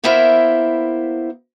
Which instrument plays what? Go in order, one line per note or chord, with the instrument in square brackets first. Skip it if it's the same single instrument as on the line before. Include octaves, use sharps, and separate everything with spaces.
[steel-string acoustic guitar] A#3 B3 E4 A#4 C5 E5